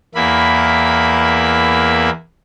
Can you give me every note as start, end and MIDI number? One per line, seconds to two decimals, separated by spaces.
0.15 2.10 40
0.15 2.10 58
0.15 2.10 64
0.15 2.10 83